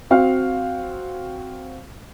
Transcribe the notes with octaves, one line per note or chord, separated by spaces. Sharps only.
C4 F#4 F5